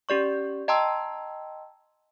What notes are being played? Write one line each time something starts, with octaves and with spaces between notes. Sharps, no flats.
C#4 G4 D5 C#6
D#5 G5 A5 A#5 C6 E6